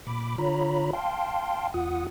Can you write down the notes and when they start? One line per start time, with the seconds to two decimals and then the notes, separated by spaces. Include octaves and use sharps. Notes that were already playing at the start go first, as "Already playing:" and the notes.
0.07 A#2 B5 D6
0.38 D3 F4 C#5 A#5 B5
0.93 F5 G5 A5 C6
1.74 E2 F4 F#5 D#6